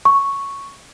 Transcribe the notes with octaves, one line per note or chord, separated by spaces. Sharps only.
C#6